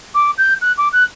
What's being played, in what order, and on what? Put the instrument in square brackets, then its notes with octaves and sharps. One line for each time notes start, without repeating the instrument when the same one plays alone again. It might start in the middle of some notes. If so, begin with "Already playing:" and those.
[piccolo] D6
G6
F#6
D6
F#6